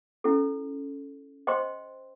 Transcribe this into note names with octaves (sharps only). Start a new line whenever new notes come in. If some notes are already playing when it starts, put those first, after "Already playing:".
C#4 E4 A4
C5 D#5 G5 C6